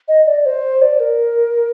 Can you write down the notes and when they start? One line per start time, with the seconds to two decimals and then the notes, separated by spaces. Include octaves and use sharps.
0.08 D#5
0.27 D5
0.46 C5
0.82 D5
1.00 A#4